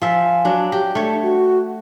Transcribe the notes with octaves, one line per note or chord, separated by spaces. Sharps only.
F3 E5 G#5
F#3 D4
G4
A3 D4 C#5
F#4